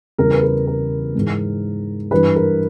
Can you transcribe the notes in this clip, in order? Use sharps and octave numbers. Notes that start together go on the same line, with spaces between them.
E2 C#3 E3 G3 A#4
B4
A#4
A#4
G#2 E3 G#3
G2 E3 G3 B4
A#4